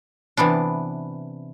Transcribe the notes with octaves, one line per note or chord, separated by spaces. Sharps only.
C3 E3 B3 D4